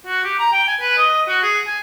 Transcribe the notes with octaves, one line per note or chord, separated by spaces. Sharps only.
F#4
G4
A#5
G5
G#5
B4
D#5
F#4
G#4
G#5